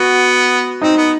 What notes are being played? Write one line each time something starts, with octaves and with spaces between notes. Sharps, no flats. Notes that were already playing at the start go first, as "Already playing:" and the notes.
Already playing: B3 F#4
C4 D#4
B3